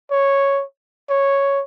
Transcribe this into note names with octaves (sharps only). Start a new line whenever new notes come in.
C#5
C#5